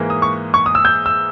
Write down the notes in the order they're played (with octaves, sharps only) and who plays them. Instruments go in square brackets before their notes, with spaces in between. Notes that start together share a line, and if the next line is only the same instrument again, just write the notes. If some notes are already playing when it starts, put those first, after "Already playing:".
Already playing: [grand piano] G#2 E3 A#3
D#6
C#6
C#6
D#6
E6
G6
E6